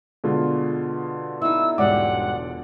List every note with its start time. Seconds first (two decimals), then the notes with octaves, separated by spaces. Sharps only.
0.24 B2 D3 G#3 F4
1.42 D#4 E4 E6
1.78 E1 G#2 G3 D5 F#5 D6